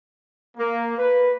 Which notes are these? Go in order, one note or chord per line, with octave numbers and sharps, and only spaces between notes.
A#3
B4